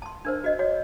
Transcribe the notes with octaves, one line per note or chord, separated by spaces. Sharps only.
A5 C6
D4 A#4 C5
F#4 D#5
F#4 C#5